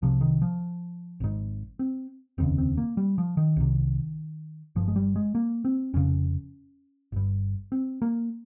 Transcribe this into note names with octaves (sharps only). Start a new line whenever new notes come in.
C2 C3 F3
D#3
F3
G#1 G#2
C4
F1 D#2 C#3 C4
C4
A#3
G3
F3
D#3
C2 C3
G1 G2 F3
G#3
G3
G#3
A#3
C4
F1 F2 C#3 C#4
G1 G2
C4
A#3